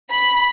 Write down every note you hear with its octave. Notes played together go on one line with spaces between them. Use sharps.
B5